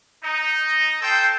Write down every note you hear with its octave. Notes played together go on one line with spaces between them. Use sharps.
D#4
A4 C5 G5